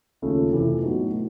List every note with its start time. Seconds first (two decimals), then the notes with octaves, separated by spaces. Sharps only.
0.22 D#2 C#3 F3 A3
0.53 F2 C3 E3 A3
0.83 A2 F#3 B3 D#4
1.14 A2